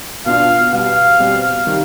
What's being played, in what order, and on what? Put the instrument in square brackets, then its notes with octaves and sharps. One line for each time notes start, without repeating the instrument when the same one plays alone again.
[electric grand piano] B2 B3 D4 F4 [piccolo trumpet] F5
[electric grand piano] B2 G3 B3 [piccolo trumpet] F5
[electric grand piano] B2 G3 C4
C3 D#3 G3